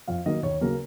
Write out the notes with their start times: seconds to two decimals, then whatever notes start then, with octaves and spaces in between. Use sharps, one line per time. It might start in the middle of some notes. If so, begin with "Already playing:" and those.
0.08 F2 F5
0.26 D#3 F#3 A#3 D#5
0.43 D#2 C#5
0.61 C#3 F#3 A#3 A#4